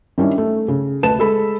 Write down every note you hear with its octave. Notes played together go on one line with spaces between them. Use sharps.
D#3 G3 C#4 D4 E4
A3
C#3
D2 B4 A5 E7
G#3 A4 B5